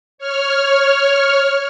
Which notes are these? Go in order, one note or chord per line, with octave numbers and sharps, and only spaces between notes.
C#5 F6